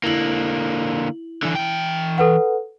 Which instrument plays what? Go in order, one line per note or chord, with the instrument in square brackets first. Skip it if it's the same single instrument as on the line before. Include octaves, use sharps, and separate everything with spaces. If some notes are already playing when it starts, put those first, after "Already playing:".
[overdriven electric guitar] D3 A#3 [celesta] E4 F#7
[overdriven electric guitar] D3 E3
E3 G5
[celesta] A4 B4 F#5